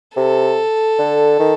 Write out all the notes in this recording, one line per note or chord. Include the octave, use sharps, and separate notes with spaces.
C3 A4
D3
D#3